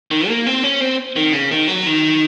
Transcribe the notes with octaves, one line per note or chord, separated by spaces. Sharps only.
D#3
A#3
C4
C#4
C4
D#3
C#3
D#3
F#3
D#3